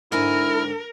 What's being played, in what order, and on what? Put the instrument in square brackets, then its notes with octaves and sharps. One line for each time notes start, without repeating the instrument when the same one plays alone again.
[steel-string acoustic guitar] G#2 D3 G#5 [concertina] E4 F6 [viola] A#4